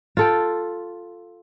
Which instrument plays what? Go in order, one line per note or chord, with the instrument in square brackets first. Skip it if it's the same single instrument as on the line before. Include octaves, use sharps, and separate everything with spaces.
[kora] F4 A4 G5